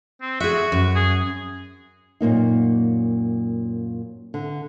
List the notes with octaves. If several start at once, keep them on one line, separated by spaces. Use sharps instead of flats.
C4
F#4 G#4 E5
F#2
G#4
F#2 A#2 A#3 D#4
D3